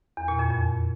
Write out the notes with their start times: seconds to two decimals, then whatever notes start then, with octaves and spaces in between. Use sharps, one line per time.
0.17 E2
0.28 A#2
0.39 F2
0.50 F2